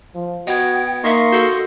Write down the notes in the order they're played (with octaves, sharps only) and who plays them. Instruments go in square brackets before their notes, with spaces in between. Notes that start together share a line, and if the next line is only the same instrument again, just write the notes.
[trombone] F3
[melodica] B3 [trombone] F#4 [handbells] D#5 G#6 [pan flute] G5
[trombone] A#3 [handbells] D#4 [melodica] D#5 C6 C#6 [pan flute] E5
[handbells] F#4 [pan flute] A4